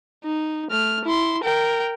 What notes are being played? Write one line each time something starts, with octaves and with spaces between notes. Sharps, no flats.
D#4
A3 F6
E4 C6
A#4 G5